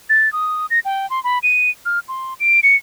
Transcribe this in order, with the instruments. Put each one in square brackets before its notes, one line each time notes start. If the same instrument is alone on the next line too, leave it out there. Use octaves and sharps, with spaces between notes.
[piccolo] A6
D#6
A#6
G5
C6
B5
D#7
F6
C6
D7
C#7